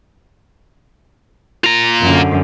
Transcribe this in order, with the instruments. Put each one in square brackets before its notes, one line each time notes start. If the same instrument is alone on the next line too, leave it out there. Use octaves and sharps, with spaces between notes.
[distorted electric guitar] F4 A#5
[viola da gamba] F#2 D3